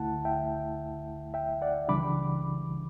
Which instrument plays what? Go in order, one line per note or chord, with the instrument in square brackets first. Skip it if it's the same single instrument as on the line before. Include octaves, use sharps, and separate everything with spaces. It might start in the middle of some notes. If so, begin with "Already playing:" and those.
Already playing: [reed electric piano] D2 D3 A3 E4 F#5 A5
E5 G5
E5 G5
D5 F#5
C#2 C#3 E3 G3 D4 B5 D6